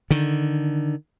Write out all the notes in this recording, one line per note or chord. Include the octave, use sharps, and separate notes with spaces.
D3 D#3